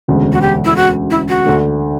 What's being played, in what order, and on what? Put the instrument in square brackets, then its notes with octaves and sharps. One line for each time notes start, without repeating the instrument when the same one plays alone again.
[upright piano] E1 D2 C#3
[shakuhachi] F#4
G4
E4
F#4
E4
F#4
[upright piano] D2 D3 A3